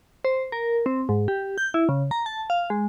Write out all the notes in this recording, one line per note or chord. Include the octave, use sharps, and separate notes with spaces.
C5
A#4
C4
G#2
G4
G6
E4
C#3
A#5
A5
F5
G#3